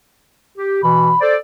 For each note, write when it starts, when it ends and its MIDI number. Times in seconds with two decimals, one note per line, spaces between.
0.57 0.82 67
0.83 1.12 47
0.83 1.12 52
0.83 1.20 83
1.20 1.36 69
1.20 1.36 72
1.20 1.36 74